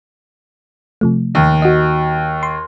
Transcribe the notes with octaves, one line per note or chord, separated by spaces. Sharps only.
C3 F3 A3
D#2
F#4 D#5
C6